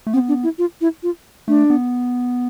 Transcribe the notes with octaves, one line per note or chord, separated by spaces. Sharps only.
A3
B3 C4
D4
E4
F4
E4
F4
A3 D4
B3